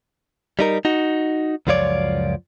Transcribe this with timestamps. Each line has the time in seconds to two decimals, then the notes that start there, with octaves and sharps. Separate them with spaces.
0.59 G3 D#4 A#4
0.85 D#4 F#4
1.67 C#2 F#2 F3 F4 C#5 D5